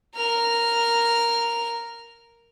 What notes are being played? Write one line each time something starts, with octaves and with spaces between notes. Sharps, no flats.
A#4 F6